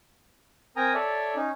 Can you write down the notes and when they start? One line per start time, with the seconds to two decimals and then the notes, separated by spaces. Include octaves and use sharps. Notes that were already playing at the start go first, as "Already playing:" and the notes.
0.76 C4 A#4 G5 G#5 A#5 D#6
0.94 A4 C#5 D5 E5
1.36 C#4 D#4